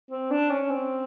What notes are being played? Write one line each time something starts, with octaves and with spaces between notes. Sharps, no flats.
C4
D4
C#4
C4